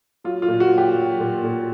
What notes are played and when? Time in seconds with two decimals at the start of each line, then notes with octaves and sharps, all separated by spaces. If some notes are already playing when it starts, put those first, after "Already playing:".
0.24 F#3 F4
0.42 F4
0.48 A#2
0.60 F#4
0.72 F#3
0.78 G4
0.96 F#3
1.19 A#2
1.44 A#2